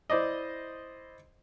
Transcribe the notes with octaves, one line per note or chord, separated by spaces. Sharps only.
E4 C5 D5 D#5